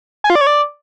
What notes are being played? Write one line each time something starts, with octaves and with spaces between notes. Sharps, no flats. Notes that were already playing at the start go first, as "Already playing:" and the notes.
G#5
F4
D5
C#5
D5